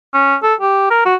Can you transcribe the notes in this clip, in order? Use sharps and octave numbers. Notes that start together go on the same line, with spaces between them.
C#4
A4
G4
A#4
F#4